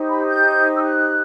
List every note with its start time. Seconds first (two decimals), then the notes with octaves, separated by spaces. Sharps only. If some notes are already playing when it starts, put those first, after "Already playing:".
Already playing: D#4 G4 C5
0.08 B5
0.28 G6
0.76 E6
0.84 F#6